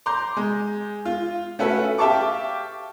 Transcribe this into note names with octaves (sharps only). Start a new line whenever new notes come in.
A#5 C6 D6 G6
G#3
F4
A3 C#4 F#4 A4 B4 E5
G4 E5 F5 A5 C#6 D6